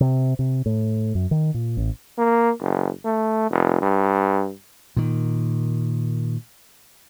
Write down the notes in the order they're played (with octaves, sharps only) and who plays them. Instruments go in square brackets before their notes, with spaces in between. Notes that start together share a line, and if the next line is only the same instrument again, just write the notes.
[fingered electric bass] C3
C3
A2
F#2
D#3
A#2
A1
[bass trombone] A#3
F#1
A3
F1
G2
[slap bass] A#2 D#3